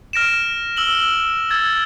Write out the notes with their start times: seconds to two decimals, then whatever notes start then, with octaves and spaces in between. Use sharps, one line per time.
0.13 F6 A#6 D7 E7
0.77 E6 F#7 G7
1.50 E6 G#6 A6